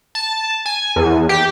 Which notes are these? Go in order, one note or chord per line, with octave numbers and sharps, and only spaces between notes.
A5
G#5
E2
G4